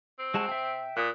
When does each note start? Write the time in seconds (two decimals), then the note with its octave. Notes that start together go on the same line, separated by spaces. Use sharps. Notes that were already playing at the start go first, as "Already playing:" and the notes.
0.19 C4
0.34 G#3 F#4 A5
0.49 E5 G5
0.97 A#2 D#6 F#6